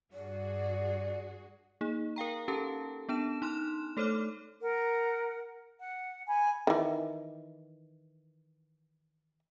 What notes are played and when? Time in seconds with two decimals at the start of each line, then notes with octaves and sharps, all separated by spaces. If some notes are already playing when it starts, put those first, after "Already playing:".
0.13 G2 F#4 G#4 D5
1.81 A#3 D#4 G#4
2.16 A#4 F5 G5 A#5
2.48 C#4 G4 A4 A5
3.09 B3 D4 A5 E7
3.42 D#4 C6 F6 F#6 E7
3.97 A3 A4 C5 C#5 D6 F6
4.61 A#4 F#5
5.79 F#5
6.27 G#5 B5
6.67 D#3 E3